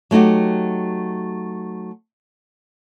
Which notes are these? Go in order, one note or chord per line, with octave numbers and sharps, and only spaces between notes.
F#3 A3 D#4 F#4 G4